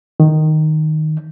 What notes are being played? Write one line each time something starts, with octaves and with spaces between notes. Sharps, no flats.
D#3